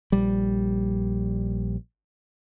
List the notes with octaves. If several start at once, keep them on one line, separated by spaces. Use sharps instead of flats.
A#1 G3